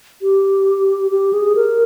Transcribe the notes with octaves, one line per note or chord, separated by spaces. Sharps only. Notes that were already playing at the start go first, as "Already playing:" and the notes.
G4
G4
G#4
A#4